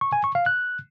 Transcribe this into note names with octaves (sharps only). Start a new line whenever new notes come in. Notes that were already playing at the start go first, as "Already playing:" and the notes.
C#6
G#5
C#6
F5
F#6